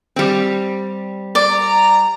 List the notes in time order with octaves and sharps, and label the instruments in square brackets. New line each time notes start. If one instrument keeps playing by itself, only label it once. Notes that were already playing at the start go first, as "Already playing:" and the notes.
[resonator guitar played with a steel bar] G3 C4
[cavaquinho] D5
[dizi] A#5